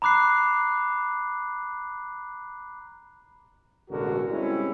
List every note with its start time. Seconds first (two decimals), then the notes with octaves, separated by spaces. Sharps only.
0.02 A#5 B5 D6 F#6 C7
3.90 A1 B2 D3 G#3 F#4 A#4
4.30 G3 G#3 C4 C#4 E4